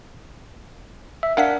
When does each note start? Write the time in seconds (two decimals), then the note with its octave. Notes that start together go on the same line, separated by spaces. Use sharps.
1.23 E5
1.37 D4 A#4 F5 F#5 B6